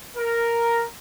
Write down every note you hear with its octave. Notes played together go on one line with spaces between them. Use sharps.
A#4